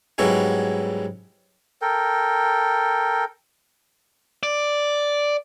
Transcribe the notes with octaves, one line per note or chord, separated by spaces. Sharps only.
G#2 F#3 G3 B3 C#4 E4
A4 A#4 G5
D5